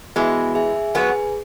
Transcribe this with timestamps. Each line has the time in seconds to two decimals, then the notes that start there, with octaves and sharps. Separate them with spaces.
0.16 E3 G#3 B3 F#4 E5 G#5
0.55 G#4 E5 G#5
0.95 F#3 B3 G#4 B4 G#5